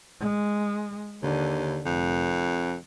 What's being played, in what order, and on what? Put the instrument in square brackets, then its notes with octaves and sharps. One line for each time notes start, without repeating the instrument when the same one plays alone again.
[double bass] G#3
[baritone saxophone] D#2 [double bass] D3
[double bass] F1 [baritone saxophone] F2